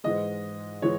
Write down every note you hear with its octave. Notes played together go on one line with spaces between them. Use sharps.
G#2 E3 G#3 D#5
E3 G#3 C#5